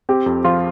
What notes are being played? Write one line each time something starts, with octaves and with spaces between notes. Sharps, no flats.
C4 G4
F2
F3 F4